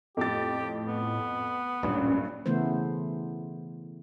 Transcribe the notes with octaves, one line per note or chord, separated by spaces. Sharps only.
F2 A2 G4 A6
B3
D1 G2 A#2 C#4
C#3 E3 A3 B3 C5